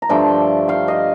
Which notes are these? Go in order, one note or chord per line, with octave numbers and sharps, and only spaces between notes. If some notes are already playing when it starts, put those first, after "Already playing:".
A#5
G2 D3 F3 A3 G5 A5
F5 G5
D#5 F5